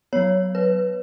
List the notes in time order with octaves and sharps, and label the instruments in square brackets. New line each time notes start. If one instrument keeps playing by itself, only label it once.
[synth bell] F#3 B3 C#5
B4